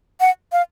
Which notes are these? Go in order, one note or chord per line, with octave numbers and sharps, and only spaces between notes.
F#5
F5